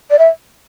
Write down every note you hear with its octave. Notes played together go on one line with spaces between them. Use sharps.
D5
E5